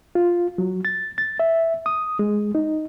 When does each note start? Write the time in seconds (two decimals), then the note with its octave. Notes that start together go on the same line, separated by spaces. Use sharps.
0.15 F4
0.58 F#3
0.85 A6
1.18 A6
1.39 E5
1.86 D#6
2.19 G#3
2.55 D#4